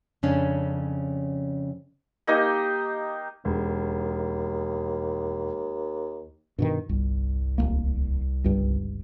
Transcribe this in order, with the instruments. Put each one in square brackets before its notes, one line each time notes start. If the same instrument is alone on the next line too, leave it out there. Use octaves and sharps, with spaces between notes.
[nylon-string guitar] F2 C#3 C#4 D4
[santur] A#3 D#4 G4 D#5
[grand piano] E1 [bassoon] D#2
[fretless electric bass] G2 B2 D#3
[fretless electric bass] G1 [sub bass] C2
[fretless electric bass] D1 G1 A#3
G1 C#2 G2